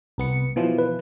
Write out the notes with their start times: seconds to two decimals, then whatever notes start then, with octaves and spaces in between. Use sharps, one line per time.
0.18 C2 B3 C#7
0.56 B2 E3 F3
0.79 B4